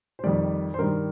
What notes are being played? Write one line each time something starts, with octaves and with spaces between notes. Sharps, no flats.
C5
F2 D#3 G3 D5
C5
G2 D#3 G3 A#4